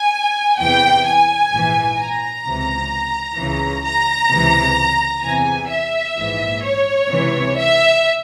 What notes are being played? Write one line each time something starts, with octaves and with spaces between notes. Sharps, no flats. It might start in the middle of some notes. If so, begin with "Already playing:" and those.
Already playing: G#5
E2 C3 E3 G5
G#5
A#1 G#2 E3
A#5
C#2 C3 E3
C#2 C#3 E3
A#5
C#2 C3 E3
E2 C3 E3 G#5
E5
A#1 G#2 E3
C#5
C#2 C3 E3
E5